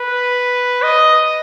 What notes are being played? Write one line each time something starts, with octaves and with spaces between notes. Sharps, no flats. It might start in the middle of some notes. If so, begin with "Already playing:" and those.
Already playing: B4
D#5